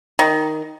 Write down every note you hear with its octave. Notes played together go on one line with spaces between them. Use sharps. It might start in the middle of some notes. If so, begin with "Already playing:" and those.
D#3